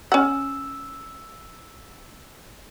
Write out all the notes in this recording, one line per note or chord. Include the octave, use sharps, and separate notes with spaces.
C#4 F#5 E6